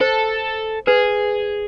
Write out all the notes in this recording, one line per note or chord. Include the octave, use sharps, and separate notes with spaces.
A4 C5
G#4 B4